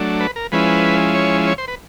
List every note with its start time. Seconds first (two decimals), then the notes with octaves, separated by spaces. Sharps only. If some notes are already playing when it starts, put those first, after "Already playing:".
Already playing: F#3 A3 D4
0.20 B4
0.36 A#4
0.52 F3 G#3 C#4 E4 B4
1.15 C#5
1.47 C#5
1.58 C5
1.68 B4